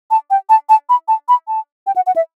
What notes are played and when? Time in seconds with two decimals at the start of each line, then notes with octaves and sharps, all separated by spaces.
0.11 A5
0.31 G5
0.49 A5
0.69 A5
0.89 B5
1.08 A5
1.29 B5
1.48 A5
1.87 G5
1.96 F#5
2.07 F#5
2.16 E5